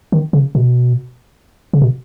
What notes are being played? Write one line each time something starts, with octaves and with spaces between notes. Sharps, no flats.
D#3
C#3
B2
C#3
B2